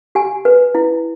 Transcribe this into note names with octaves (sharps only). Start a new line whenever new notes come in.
G4 G#5
B4
E4